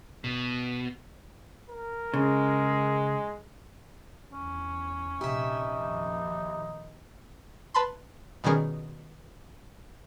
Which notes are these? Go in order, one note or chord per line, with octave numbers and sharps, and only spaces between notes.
B2
A#4
C#3 G#3
E2 C#4
A#1 C3 D#4 G4 E5
F2 A#2 D#3
B4 A5 B5 C6
B2 D#3 G3 C#4 G#4 A#4